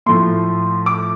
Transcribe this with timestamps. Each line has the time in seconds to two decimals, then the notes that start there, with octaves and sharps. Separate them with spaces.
0.06 A2 F3 A3 C6
0.86 D6